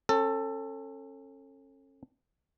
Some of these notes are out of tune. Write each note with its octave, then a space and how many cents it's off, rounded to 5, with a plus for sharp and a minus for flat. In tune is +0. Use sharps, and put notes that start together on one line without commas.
C#4 -35 A4 +15